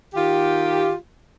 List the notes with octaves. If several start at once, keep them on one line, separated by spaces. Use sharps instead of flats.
D#3 F4 G4